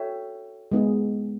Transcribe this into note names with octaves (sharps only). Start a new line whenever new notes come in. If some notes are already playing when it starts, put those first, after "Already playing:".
Already playing: F#4 A4 C#5 E5 G5
G#3 B3 D#4 G#4